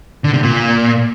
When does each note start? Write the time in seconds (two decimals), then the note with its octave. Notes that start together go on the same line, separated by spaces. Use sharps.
0.24 D3
0.34 C3
0.43 A#2